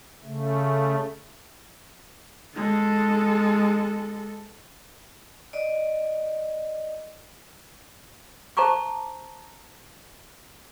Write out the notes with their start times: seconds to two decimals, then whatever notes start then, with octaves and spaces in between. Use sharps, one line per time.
0.24 C#3 A3
2.56 G#3 A4
5.53 D5 D#5
8.57 C5 A5 A#5 C#6 D6